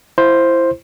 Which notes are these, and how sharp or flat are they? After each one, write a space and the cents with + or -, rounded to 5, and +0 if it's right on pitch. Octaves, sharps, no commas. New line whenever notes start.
E4 +20 C5 +5